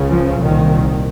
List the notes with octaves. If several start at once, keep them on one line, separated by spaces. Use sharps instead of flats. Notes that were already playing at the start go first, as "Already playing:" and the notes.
Already playing: C#2 C#3
F3
C2 A#2 D#3